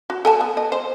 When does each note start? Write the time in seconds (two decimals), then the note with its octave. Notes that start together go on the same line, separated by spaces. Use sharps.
0.10 F#4
0.25 A4 G#5 A5
0.41 B3
0.57 D#5
0.72 C5